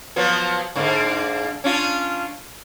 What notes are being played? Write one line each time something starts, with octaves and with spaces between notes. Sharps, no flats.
F3 F#3 B3
G#2 D3 A#3
C#4 D4 F4